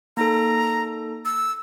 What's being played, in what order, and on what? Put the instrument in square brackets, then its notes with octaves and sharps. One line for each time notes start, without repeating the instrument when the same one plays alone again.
[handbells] A#3 D#4 A4 [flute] A#5
[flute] E6